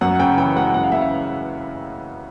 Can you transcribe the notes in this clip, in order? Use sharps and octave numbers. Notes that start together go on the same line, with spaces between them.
F#2 F#5
F#5
C#3 G5
E3 G5
G#3 F#5
F#2 F#5
F5
C#3 E5
F5